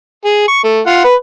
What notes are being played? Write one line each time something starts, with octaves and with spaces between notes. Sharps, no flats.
G#4
C#6
A3
F4 F#5
B4